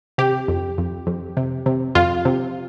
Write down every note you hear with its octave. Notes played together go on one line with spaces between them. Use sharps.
C3 G4
F2
F2
F2
C3
C3
F2 F4
C3